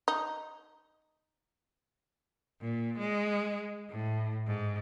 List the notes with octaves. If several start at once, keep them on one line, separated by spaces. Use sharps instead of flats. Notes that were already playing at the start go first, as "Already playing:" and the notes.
D#4
A#2
G#3
A2
G#2